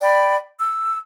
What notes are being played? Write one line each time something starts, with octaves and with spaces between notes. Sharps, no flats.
D5 G5 B5
E6